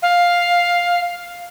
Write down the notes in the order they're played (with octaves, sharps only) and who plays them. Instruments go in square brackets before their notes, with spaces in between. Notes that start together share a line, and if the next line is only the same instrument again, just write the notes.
[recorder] F5